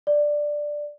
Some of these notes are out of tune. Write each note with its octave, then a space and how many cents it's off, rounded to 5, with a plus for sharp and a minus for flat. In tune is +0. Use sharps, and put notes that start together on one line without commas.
D5 +5